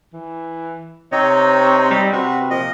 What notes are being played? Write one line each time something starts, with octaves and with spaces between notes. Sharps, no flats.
E3
C3 C4 D#4 C#5 D#5
G3
C3 F#4 B4
A#2 F3 D#5